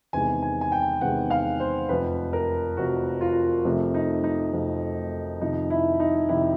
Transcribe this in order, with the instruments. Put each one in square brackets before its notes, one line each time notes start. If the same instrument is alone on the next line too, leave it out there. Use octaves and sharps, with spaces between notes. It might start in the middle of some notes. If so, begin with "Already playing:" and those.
[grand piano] E2 C3 D#3 G#3 G#5
G#5
G#5
G5
E2 C3 D#3 G#3 F#5
F5
C5
F1 F2 C3 B4
A#4
F1 F2 C3 F#4
F4
F2 C3 F3 A3
D#4
D#4
F2 C3 F3 A3
F2 C3 D#3 D#4
E4
D#4
F2 C3 D#3 E4